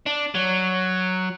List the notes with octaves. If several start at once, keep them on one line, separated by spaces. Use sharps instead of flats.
D4
F#3